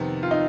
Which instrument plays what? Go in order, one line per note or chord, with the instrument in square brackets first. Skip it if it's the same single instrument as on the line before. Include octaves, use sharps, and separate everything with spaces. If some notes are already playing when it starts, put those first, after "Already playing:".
Already playing: [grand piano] F2 C3 D#3 B3
[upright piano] F4
D#4